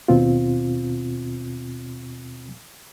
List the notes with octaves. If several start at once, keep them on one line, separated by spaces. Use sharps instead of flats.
D#2 B2 C4 F4